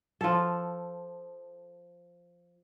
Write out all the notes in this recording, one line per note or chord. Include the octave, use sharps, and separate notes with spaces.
F3 A4